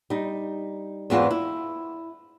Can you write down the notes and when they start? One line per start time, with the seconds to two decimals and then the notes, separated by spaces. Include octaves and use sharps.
0.10 G3 D#4
1.10 E2 G#2 E3 C4 F4 F#4
1.31 E4